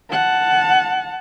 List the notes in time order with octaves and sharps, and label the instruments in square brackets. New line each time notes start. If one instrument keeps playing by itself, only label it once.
[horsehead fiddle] F#5 A5